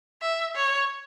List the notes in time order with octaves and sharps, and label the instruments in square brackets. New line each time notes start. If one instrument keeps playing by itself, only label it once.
[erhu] E5
C#5